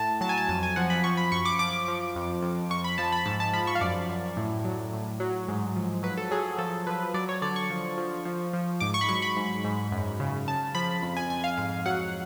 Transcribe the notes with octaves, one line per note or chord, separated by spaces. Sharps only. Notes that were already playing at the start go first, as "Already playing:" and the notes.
Already playing: A2 A5
F#3 A5
G#5
A5
F2 A5
G#5
F3 F#5
B5
F3 C#6
B5
F#2 C#6
D6
F3 D6
F3
F2
F2
F2 C#6
B5
F3 A5
B5
G#2 A5
A5
F3 B5
C#6
F5
F#2 D5
F#2
A2
F#3
A2
F#3
G#2
F3
F#3 B4
A4
F#3 G#4
F3 A4
F3 B4
F#3 D5
C#5
D3 D5
C#6
F3
F3
F3
F3
G#2 D6
C#6
B5
F#3 C#6
B5
G#2
G#2
F#2
C#3
C#3 A5
F3 B5
F2
G#5
F2 G#5
F5
G#2 F5
F#3 F#5